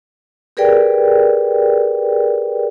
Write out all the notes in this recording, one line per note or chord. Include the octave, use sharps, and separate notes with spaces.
G4 G#4 A#4 B4 D5 G5